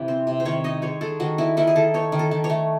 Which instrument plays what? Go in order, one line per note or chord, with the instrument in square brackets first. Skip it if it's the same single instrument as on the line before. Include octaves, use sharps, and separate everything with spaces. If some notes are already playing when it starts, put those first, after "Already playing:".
Already playing: [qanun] C3 E3
C4
C3
C5
D#3 C#5
D#4 D#5
G#3 C#5
G#3 A4
D#3 F#4
D#4 E4
D#3 E4
G#4
D#3 A4
D#4 C#5
D#3
A4
D#3
C#5
A3